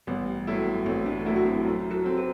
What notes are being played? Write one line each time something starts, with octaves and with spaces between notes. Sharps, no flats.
A1 G3 B3
A2 F#3 A3 E4
A1 A3 C4
B3 D4
A2 F#3 A3 E4
F#4
C4 E4
F#2
F#4 A4
F#3 C4
G4 B4